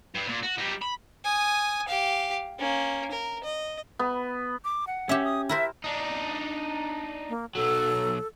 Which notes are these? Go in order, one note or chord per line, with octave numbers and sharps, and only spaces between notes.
G2
A#2
F#4
G3 D#4
B5
G#5 D#6
G4 F5
A#3 C#4
A#4
D#5
B3
D6
F#5
C#4 G4 E5
D#6
E4 A#4 C5 E5
D4 D#4
A#3
B1 F#3 A4